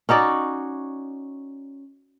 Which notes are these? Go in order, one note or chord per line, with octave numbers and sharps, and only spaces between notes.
C#4 D#4 F#4 D5